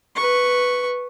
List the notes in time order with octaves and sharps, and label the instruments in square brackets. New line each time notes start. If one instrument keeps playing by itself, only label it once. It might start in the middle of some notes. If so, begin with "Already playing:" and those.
[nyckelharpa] B4 C#6